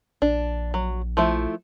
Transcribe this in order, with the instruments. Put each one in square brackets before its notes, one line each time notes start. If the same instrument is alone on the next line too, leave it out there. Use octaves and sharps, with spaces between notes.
[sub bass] A#1 [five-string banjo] D4
[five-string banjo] F#3
F3 A3 E4